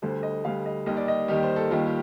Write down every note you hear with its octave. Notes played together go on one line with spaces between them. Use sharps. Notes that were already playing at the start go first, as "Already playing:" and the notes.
D2 D3 G3 C5
D#5
D2 D3 G3 F5
D#5
D#2 D#3 G3 D#5
D5
D#5
D#2 D#3 G3 G4
C5
A4
D#2 D#3 G3 F4
G4